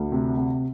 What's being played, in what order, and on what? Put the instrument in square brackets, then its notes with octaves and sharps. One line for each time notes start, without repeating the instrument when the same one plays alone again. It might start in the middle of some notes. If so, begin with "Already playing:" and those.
Already playing: [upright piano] D2
C3
C3